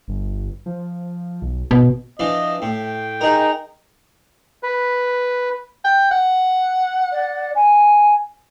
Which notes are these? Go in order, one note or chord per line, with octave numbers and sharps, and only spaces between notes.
G1
F3
B1
G#1 B2
E3 F3 D4 D#5
A2 G5
D#4 G#4 A#4
B4
G5
F#5
D5
G#5